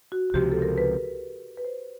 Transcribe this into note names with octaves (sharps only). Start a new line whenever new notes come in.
F#4
F#4
C#2 C3 F3 G4
A4
A#4
B4
B4
C5